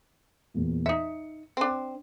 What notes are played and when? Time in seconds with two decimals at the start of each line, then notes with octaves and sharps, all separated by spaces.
0.54 E2 A#2
0.86 D#4 E5 C#7
1.57 C4 D4